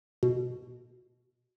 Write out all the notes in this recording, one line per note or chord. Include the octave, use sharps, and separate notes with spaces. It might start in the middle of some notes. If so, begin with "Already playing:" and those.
B2